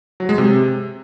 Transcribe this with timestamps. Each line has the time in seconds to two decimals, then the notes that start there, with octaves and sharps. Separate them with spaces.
0.20 F#3
0.29 G#3
0.38 C3